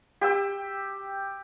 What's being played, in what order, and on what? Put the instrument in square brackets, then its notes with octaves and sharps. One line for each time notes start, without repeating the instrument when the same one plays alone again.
[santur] G4 G5 E6